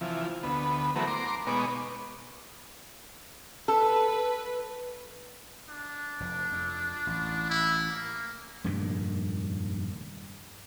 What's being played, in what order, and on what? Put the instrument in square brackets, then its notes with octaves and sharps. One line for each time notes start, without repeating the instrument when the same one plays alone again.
[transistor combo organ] C3 E3 F3
D2 B3
E3 F#3 A3 B3 C4 A#4
A#5 C6 D6
B2 G#3 B3 D#4 C#5 D6
[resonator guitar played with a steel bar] A4 [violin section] B4
[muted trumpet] D4
[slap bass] F1
F2
A1
[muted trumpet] E4
A#3
[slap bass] F1 G2 A#2 D#3